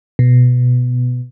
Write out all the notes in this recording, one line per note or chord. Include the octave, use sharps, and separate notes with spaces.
B2